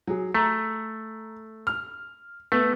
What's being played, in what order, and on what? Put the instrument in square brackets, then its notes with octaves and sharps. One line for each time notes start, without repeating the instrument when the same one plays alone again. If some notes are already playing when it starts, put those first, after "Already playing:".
[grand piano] F#3 G#4
[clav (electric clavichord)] A3 [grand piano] A#5
[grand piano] F6
[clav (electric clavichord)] A3 [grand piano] B3